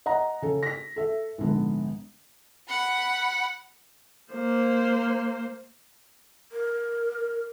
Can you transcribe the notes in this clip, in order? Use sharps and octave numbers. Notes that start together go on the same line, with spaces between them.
D#5 F#5 A#5
C#3 A4
A#6 B6
A4 E5
A#1 G#2 D3 B3
F#5 B5
A#3 C5
A#4